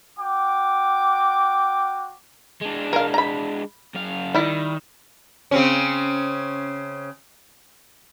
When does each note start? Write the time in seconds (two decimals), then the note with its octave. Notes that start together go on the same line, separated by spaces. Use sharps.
0.18 F#4 G5 D6
2.61 G#3 D4
2.93 A#4 F5
3.14 A#5 B5
3.94 F#2 F5
4.34 D#3 G3 E4
5.51 C#3 C4 C#4